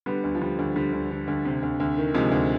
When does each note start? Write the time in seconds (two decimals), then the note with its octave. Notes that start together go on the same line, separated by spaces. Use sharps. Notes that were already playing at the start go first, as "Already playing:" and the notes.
0.06 D3 G3 B3
0.24 D2
0.35 F3
0.41 D3 G3
0.59 D2
0.76 D3 G3
0.93 D2
1.11 D3
1.28 D2
1.45 C3
1.63 D2
1.80 D2
1.97 D#3
2.14 C3 F3 G#3
2.32 D2